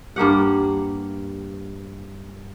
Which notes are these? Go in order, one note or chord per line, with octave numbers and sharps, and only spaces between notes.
G2 A#3 G4 F#5